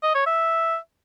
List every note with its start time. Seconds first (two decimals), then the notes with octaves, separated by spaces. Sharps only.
0.03 D#5
0.15 C#5
0.27 E5